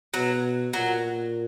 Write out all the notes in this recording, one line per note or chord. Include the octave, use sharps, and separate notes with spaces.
B2 F#3
A#2 F#3